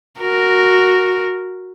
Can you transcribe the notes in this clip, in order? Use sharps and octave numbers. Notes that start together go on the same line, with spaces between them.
F#4 A#4